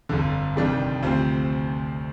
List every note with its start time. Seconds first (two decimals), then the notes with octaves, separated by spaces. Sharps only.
0.09 G1 F2 D3
0.55 F1 F2 D#3 G3 D4
1.03 D2 C3 F3 C4